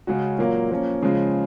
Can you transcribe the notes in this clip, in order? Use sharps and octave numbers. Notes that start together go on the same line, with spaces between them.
C#3 G#3 C#4 F#4
A#2 F#3 A#3
F3 A#3 C#4
C#3 F3 G#3